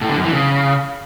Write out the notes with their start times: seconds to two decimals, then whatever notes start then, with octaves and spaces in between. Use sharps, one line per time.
0.01 A2
0.09 D3
0.17 F#2
0.25 E3
0.32 C#3